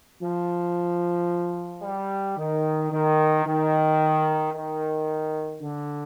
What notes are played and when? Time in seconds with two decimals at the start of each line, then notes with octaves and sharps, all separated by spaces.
0.22 F3
1.83 G3
2.37 D#3
2.91 D#3
3.45 D#3
4.53 D#3
5.61 D3